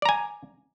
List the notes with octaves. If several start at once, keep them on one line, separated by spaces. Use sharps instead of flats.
D5 G#5 A#5